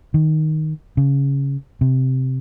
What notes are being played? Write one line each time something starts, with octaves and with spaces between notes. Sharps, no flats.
D#3
C#3
C3